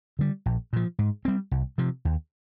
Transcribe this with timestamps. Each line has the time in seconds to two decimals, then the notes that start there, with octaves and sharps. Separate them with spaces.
0.19 D3 G3
0.46 A#1
0.73 A#2 F3
0.99 G#2
1.25 G3 C4
1.51 C2
1.78 C3 F3
2.05 D#2